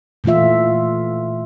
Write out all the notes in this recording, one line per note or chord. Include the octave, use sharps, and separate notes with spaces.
A#2 E3 A3 F4 E5